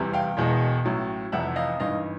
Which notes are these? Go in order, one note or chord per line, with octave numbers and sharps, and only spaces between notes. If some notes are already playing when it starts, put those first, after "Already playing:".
Already playing: F1 E2 C3 E3 G3
F5 G5
E1 E2 B2 G#3
A1 A2 F#3
F1 F2 C3 E3 E5 F#5
D#5 F5
G#1 G2 E3 D#5 F5